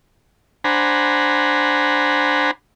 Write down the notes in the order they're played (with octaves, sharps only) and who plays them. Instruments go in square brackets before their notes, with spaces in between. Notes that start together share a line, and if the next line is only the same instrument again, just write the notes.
[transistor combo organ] D4 C5 F#5 G#5 A#5 B5